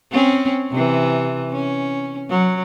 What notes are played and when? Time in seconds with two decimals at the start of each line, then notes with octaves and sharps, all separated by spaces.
0.12 C4 C#4
0.72 C3 E3
1.52 C#4
2.30 F#3